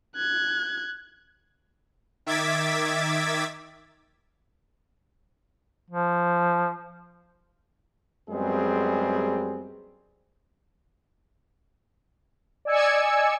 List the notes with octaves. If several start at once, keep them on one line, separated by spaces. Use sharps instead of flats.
F#6 G#6
D#3 E5 D6 G#6 A6 B6
F3
F#2 G3 G#3 B3 C4 G#4
D5 D#5 G#5 E6 G#6 C#7